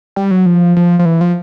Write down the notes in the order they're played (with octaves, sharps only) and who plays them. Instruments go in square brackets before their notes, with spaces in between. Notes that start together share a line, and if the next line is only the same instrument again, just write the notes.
[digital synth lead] G3
F#3
F3
F3
F3
E3
F3